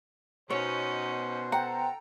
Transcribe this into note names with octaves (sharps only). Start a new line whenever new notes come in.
B2 C#4 D#4 C5 C#5
A4 F#5 G5 A#5